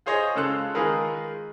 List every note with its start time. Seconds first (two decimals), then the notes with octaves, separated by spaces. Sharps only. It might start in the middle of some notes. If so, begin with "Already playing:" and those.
0.06 F4 G#4 C5 C#5 D#5
0.35 C#3 G#3 F4 A4 E6 F#6
0.75 D#3 G#3 F4 G#4 A#4 B4